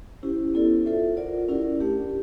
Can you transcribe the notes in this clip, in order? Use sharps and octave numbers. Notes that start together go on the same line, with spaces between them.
C#4 E4 G4 C5
B3 E4 A4 D5
F4 A4 C5 E5
F4 A#4 D5 F#5
C#4 E4 G4 A#4 D5
A3 D4 G4